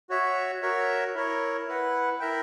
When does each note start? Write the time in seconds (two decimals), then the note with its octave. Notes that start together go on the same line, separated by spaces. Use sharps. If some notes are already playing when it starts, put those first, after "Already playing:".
0.09 F#4 C#5 E5
0.62 F#4 A#4 C#5 E5
1.15 E4 A#4 C#5
1.67 E4 B4 F#5
2.20 E4 A#4 E5 G5